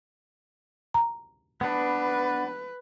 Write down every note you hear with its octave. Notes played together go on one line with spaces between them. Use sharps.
A#5
B3 D4 B4